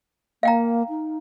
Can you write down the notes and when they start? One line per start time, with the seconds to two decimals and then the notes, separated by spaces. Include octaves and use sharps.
0.43 A#3 F5 G5 A#5
0.89 D#4